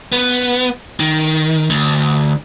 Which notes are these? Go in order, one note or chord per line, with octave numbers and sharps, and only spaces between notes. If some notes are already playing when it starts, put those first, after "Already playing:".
B3
D#3
D2